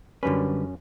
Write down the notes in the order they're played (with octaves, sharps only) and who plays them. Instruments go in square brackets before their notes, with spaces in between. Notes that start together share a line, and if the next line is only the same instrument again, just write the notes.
[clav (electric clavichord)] F#2 C#4 [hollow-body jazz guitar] D3 G3 B4